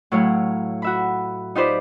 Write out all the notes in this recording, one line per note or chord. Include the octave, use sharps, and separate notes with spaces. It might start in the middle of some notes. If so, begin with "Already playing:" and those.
A2 F#3 E4 C#5 F5
F#4 E5 B5
D#4 F4 G4 B4 C5 D5